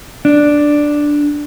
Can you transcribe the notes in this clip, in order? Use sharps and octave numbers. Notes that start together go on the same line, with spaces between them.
D4